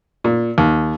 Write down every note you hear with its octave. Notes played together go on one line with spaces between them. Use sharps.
A#2
D#2